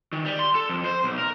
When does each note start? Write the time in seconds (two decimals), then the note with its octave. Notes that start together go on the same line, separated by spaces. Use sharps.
0.13 D#3
0.25 G3
0.39 C6
0.55 A4
0.69 F2
0.84 C5
1.04 B1
1.18 A#4